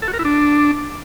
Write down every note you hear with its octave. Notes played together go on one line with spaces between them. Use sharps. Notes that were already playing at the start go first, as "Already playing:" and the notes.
A4
F#4
A#4
E4
D4